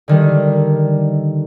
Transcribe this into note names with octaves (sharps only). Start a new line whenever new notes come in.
D3 D#3 G3